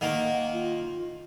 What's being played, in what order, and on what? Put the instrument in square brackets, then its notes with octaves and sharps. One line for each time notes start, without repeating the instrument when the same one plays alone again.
[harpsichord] D#3 A#3 [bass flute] F#5
[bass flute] F4